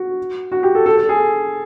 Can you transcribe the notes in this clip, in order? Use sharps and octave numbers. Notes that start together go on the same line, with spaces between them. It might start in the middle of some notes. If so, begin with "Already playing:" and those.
Already playing: F#4
F#4
G4
A4
A4
A4
G#4